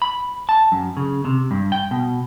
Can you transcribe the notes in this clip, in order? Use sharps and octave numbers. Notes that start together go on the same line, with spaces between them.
B5
A5
F#2
C#3
C3
G2
G5
B2